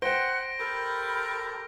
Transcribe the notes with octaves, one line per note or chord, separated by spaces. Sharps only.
C5 F#5 G5 A#6 D7 G7
G4 A4 A#4 B5